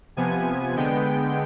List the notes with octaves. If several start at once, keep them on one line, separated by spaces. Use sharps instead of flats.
C3 F3 B3 G#5
D3 G#3 B3 G5